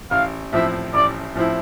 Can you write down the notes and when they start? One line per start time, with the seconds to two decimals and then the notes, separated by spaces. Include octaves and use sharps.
0.11 A1 F5
0.53 A2 F3 C4 E4 E5
0.94 A1 D5
1.35 A2 F3 C4 E4